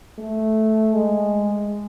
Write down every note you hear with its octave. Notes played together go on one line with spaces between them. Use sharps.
A3
G#3